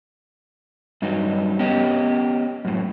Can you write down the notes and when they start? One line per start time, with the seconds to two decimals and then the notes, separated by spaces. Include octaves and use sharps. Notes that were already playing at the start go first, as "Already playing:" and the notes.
1.02 G2 F#3 D#4
1.59 B3 C#4 G4 D#5
2.65 F#2 A2